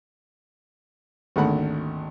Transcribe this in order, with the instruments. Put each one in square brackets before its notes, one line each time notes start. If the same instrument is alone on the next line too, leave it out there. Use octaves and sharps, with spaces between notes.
[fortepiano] G#1 D2 A3 A#3 F#5 B5